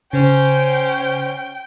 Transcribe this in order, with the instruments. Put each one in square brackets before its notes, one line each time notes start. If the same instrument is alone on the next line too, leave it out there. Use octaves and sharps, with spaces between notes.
[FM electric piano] C#3 [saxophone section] C#4 C5 [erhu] G5